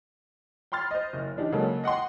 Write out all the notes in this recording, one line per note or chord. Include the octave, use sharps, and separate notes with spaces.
G5 B5 C6 F6 A6
C5 D#5
F#1
E3 D4 D#4 G4
C#3 F#3 G#3 A#3 A4
D#5 F#5 G5 C6